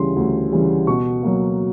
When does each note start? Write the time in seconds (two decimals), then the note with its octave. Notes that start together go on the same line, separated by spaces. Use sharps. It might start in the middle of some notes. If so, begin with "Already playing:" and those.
Already playing: D2 C#3 E3 G3 C6
0.16 D2
0.52 C#3 E3 G3
0.87 B2 C#6
1.23 F#3 A#3